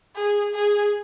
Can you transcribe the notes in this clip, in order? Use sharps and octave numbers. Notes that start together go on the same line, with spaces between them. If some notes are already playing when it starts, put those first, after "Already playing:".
G#4
G#4